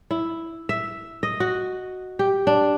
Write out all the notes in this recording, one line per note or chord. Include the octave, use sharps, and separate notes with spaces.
E4
E5
D#5
F#4
G4
D4